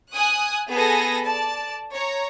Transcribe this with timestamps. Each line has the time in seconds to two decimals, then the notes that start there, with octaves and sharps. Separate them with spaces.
0.14 G#5 D#6 F#6
0.72 B3 G#4 A4 B4 G#5 A#6
1.23 D5 A5
1.95 C#5 A#5